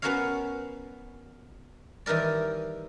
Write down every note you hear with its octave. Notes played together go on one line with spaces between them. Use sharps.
B3 C#4 F#4 A#4 C#5 F5
D#3 E3 G3 A#4 D5